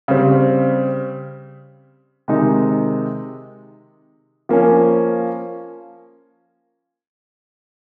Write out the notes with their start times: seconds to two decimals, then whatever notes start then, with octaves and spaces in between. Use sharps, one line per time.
0.08 C#3 G3 C4
2.28 C3 D#3 G#3 D#4
4.49 F3 A#3 C#4